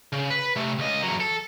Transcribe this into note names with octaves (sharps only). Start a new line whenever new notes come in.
C#3
B4
C3 A3
C#2 D#5
E2 F#3
A4